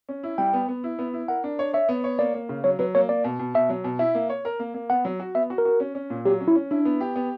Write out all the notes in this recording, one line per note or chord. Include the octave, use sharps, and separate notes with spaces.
C#4
E4
G3 G5
B3
B3
E4
B3
E4
A#4 F#5
D4
C#5
C#5 E5
B3
C#5
A#3 D5
A#3
C#3
F#3 C#5
F#3 B4
A#3 C#5
A#3 D5
B2
B2
B2 E5
F#3
B2
E4 E5
A#3
C#5
A#4
A#3
A#3
B3 F#5
F#3
F#4
B3 E5
F#4
A#4
F#4
C#4
C#4
A#2
F#3 G4
C#4
E4
C#4
D4 E4
B3
G4
B3